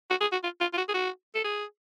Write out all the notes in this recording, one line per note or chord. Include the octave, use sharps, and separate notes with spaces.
F#4
G#4
F#4
F4
F4
F4
F#4
G#4
F#4
A4
G#4